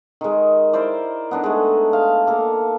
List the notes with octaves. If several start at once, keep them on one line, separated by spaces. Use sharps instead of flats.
D#3 G#3
E4 A#4 C5 D5
B3 D4 D#4
G#3 A3
F5
A#3 A4